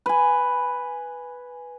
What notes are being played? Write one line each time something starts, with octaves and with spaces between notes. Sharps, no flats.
B4 G#5